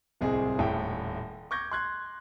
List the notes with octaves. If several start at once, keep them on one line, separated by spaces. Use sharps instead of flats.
D1 C2 C3 C4 G#4 D#5
D#1 A2 E5 G5
C#6 D6 G6 G#6 A#6
C6 F#6 G#6